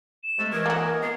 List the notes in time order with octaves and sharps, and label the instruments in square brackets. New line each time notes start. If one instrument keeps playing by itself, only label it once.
[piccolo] E7
[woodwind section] C3 G#3 A3
[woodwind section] E3 D#5 [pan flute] A#4 [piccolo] G#6
[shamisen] A#3 F#4 [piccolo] A#5
[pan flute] B3 [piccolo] C7